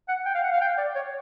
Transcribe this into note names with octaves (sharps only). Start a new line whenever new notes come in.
F#5
G5
F5
F#5
F5
G5
D5
C#5